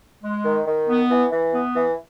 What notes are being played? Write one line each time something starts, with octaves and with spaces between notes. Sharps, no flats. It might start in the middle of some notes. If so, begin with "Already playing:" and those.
G#3
D#3
D#3
B3
E3
E3
B3
E3